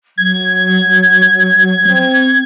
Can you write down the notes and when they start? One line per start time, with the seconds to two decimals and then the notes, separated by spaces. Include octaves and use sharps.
0.18 F#3 G#6
1.87 C4